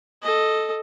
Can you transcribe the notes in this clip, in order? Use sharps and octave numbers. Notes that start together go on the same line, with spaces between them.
A4 D#5